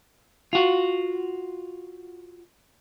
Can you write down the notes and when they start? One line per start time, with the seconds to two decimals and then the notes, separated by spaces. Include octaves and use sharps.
0.53 F4 F#4